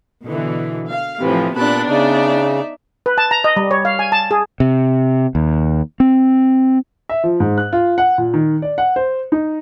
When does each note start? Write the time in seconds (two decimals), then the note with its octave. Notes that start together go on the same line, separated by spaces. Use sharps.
0.25 B2 D3 E3
0.89 F5
1.21 A2 C3 E3 F3 B4
1.55 A#2 B3 D4 A5 B5 F#6
1.88 C#3 D#4 D5 E5
3.06 B4
3.18 A5
3.31 A#5
3.44 D#5
3.56 G3
3.71 C#5
3.85 F5
3.99 G#5
4.12 A5
4.31 G#4
4.60 C3
5.35 D#2
6.00 C4
7.09 E5
7.24 F3
7.40 G#2
7.58 F#6
7.73 F4
7.98 F#5
8.18 A#2
8.34 D#3
8.62 D5
8.78 F#5
8.96 C5
9.32 D#4